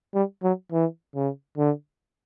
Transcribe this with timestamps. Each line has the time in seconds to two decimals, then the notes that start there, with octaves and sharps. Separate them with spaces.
0.15 G3
0.43 F#3
0.72 E3
1.16 C#3
1.58 D3